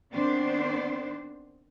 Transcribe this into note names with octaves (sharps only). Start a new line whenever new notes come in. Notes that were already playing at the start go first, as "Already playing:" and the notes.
D#3 B3 C4 D4 C5 D5